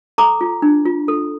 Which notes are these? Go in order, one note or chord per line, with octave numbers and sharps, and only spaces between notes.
A4 A#5 D6
F4
D4
F4
A4